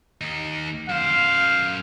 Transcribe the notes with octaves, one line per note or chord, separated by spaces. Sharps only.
D#2 D#4
F#2 C5 F5